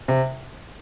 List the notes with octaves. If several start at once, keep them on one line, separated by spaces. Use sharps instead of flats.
C3